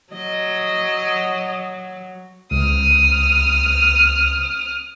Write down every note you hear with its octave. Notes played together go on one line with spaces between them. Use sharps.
F#3 D#5
C#2 D#6 F6